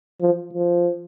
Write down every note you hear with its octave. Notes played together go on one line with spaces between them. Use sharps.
F3
F3